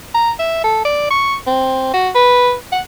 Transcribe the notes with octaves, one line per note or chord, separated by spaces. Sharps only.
A#5
E5
A4
D5
C#6
C4
F#4
B4
F#5